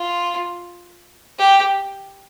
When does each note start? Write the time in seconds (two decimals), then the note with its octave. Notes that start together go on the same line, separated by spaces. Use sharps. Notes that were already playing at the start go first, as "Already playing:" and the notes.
Already playing: F4
1.39 G4